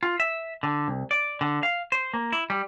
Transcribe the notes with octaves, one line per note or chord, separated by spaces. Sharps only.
F4
E5
D3
C2
D5
D3
F5
C5
A#3
E4
G3